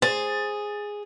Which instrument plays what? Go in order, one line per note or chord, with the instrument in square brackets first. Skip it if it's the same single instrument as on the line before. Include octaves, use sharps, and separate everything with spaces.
[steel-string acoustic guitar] G#4 [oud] C5 [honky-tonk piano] A6